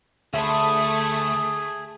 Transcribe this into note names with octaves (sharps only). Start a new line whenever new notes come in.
D2 A3 G#4 E5 B5